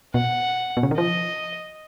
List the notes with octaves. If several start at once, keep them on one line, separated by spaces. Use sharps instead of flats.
B2 F#5
B2
C#3
D#3
F3 D#5